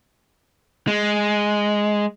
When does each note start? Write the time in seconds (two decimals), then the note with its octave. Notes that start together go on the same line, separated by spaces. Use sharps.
0.87 G#3